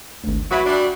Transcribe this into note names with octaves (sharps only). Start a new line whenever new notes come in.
G#1 D2
C#3 E3 F#3 F#4 E5 B5 C#6
G3 D4